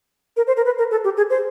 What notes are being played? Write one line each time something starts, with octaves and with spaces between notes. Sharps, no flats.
A#4
C5
A#4
B4
A#4
A4
G4
G#4
C5